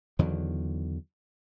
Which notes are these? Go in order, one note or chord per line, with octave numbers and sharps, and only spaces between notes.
E2 D3 D#3 F#3